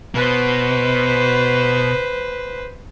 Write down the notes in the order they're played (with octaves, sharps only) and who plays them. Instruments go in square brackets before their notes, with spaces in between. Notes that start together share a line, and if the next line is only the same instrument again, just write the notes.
[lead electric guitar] B2 [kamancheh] B4 C5